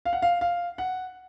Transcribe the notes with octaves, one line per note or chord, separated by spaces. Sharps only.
F5
F#5
F5
F5
F#5